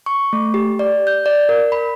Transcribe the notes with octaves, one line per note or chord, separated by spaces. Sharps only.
C#6
A3
G4
D5
G6
D5
A#4
B5